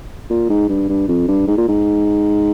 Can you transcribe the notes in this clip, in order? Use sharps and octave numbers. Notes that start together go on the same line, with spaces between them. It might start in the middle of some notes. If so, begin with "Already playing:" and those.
A#2
G#2
G2
G2
F2
G2
G#2
A#2
G#2